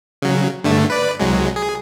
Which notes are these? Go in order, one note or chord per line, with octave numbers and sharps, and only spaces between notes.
C#3 F#3
G2 D3 A3
B4 D5
C2 F#3 G#3
G#4